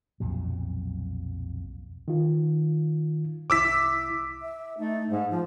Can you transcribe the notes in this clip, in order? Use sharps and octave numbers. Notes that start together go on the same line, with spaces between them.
B1 F2 A#2 F#3
D#3 F4
C2 E4 D6 E6 B6
E5
A3 D#4
G#2 G#3
F3 F4